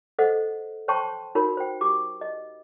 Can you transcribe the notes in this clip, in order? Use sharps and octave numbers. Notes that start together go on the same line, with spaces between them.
A4 C5 D#5 F#5
C5 C#5 G5 A5 C6 C#6
D#4 F#4 A#4 C#5 B5
C5 G5
G4 D6
D#5